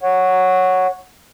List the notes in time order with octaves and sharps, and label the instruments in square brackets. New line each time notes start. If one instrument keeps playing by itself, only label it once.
[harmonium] C#5 F#5